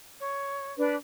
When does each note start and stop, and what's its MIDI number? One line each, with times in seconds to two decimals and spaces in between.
0.20 0.73 73
0.78 0.95 62
0.78 0.95 71